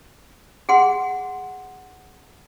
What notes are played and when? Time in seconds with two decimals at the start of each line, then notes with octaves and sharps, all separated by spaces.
0.69 G#4 F#5 C6